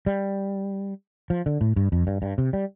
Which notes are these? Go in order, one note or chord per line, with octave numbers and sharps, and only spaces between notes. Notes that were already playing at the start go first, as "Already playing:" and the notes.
G3
F3
D3
A2
G2
F2
G2
G2
C3
G3